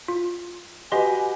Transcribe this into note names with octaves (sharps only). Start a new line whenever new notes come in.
F4
F#4 G4 B4 D#5 G#5 C6